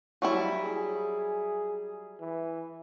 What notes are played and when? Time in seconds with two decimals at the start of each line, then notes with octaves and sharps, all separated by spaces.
0.22 F#3 G3 E4
0.64 G#4
2.20 E3